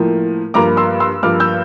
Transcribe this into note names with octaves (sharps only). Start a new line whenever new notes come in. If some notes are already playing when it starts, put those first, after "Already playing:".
Already playing: A2 F3 A#3
G2 F3 A#3 A#5 D6
C6 E6
C6 E6
G2 F3 A#3 D6 F6
E6 G6